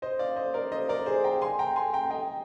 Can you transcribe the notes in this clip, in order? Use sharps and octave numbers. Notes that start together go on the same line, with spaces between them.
C5 D#5
D5 F5
C5 D#5
A#4 D5
C5 D#5
A#4 D5
G#4 C5
G5 A#5
G#5 C6
G5 A#5
G#5 C6
G5 A#5
D#5 G5